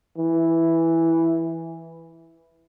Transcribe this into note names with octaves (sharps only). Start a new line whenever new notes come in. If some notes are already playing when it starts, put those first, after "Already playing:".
E3